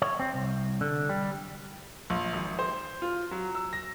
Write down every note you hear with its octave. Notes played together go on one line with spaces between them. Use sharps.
C#5
C4
C2
D3
G3
A#1
G#1
C5
F4
F#3
E6
A#6